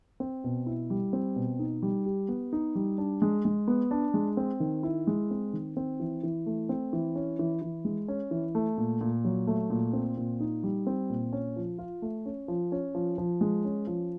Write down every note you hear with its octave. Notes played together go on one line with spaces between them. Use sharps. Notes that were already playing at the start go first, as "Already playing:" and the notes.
C4
B2
E4
G3
C4
B2
D#4
G3
G4
B3
D#4
G3
D4
G#3
G#3
B3
D4
G#3
C4
D#3
E4
G#3
C4
D#3
C4
E3
E3
A3
C4
E3
C#4
E3
E3
G#3
C#4
E3
A3
A#2
A#2
F#3
A3
A#2
C4
A#2
D#4
G3
C4
A#2
C#4
F3
F4
A3
C#4
F3
C#4
F3
F3
G#3
C#4
F3